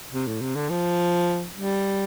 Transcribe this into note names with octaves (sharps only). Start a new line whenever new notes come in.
C3
A2
C3
D3
F3
G3